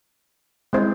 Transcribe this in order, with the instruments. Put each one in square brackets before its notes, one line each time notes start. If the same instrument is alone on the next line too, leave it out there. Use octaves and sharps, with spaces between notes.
[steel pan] G#3 C4 E4 C5